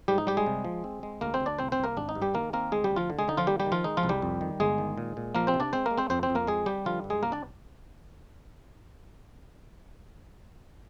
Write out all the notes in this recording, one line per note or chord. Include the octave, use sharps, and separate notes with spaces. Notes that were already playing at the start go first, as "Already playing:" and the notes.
G#2 G3 G4
D#4
G3 G4
G#3 G#4
C3
F3
C4
G#3
D2 A#3 A#4
C4 C5
D2
D4 D5
C2 C4 C5
C4 C5
C2
A#3 A#4
G#1 D4
D#4
G2
G3 G4
D#3 A#3 A#4
A#3 C4 A#4
D2 G#3 G#4
G3 G4
D2
F3 F4
D3
G#3 G#4
D3 D#4
F3 F4
G3 A#3 G4
G3 G4
D#3
F3 F4
G#3 D#4
F3 F4
C2
G3 G4
F2
D#3
G1 G#3 G#4
D#3
A#2
A#2
F3 A#3 A#4
C4 C5
C3
D4 D5
G#3 C4 C5
A#3 A#4
G#3
C4 C5
F2 C4 C5
C4 C5
F2
A#3 A#4
G#3 C4 G#4
G3 G4
D3 F3 F4
G2
G#3 G#4
C2 A#3 A#4
D4 D5